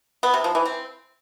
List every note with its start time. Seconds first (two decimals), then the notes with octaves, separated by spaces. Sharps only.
0.23 B3
0.34 C3
0.44 F3
0.55 E3
0.65 C4